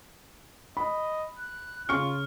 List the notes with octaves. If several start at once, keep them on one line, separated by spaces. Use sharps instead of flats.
D#5 B5
F#6
C#3 F4 C#6 F6 C#7